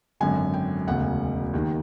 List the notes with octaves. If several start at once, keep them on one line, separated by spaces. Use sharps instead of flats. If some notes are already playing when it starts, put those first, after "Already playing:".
G#1 F#2 D3 G#5
G5
E1 D2 C#3 F#5
D#2 D#3